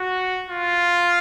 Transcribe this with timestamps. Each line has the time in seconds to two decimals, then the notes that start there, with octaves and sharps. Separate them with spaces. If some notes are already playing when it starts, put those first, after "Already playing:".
Already playing: F#4
0.50 F4